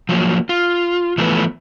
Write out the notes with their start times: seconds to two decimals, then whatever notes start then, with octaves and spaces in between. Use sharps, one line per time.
0.09 F3 F#3 A#3
0.49 F4
1.18 E3 F3 A3 B3 B4